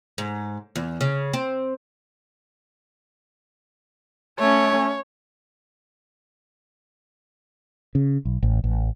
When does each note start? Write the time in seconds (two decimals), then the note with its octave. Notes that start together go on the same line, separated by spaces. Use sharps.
0.18 G#2
0.76 E2
1.01 C#3
1.33 C4
4.39 A3 C#4 C#5
7.95 C#3
8.25 B1
8.43 A1
8.64 A1